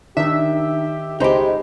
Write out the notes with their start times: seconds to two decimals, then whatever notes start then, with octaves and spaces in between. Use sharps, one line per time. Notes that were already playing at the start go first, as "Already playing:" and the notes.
0.17 D#3 D4 D#4 G4 E5
1.20 C#2 G#3 D#4 G4 C5 B5